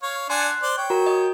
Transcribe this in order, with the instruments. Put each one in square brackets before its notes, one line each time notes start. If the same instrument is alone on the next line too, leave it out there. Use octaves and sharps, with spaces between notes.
[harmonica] C#5 F5
[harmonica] D4 F#5 G#5 [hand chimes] C6 F#6
[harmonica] C5 D5
C#5 G5
[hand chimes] F#4 A#4 A#5
D#5